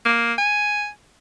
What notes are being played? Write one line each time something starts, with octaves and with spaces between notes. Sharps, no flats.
A#3
G#5